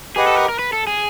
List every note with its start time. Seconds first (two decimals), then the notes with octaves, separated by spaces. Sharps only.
0.16 G4 G#4 B4 D#5 F#5
0.27 A4
0.38 A#4
0.49 A#4
0.59 B4
0.73 A4
0.87 G#4